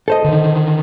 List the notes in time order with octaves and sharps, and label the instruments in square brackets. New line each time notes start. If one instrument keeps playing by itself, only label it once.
[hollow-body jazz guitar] A4 C5 D#5
[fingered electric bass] D3 D#3